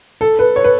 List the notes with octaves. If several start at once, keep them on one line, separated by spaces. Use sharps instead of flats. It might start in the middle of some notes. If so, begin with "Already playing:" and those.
A4
B4
C#5
B4